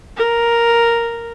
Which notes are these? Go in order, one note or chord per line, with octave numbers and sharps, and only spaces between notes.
A#4